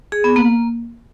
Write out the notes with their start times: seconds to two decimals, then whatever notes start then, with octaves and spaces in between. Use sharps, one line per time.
0.12 G#4
0.24 B3
0.36 A#3